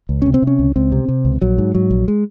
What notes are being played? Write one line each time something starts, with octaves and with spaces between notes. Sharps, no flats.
C#2
C3 C#4
C4
C3 C#4
C#2
C#2 C4
C3
C3
C#2
A#1 F#3
G#2
G#2 F#3
A#1
G#3